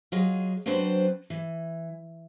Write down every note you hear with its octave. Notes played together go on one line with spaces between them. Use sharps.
F#3 F4 G#4 D#5
F#3 C4 D4 B4 C5
E3